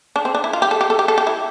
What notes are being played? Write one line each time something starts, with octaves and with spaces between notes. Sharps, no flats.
D4
C4
D4
E4
F4
G4
A4
G4
A4
G4
A4
G4
E4